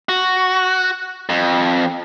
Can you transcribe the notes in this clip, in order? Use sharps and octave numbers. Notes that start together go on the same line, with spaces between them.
F#4
F2